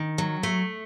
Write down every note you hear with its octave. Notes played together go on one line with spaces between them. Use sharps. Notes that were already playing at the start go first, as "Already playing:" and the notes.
Already playing: D#3
F#3
A3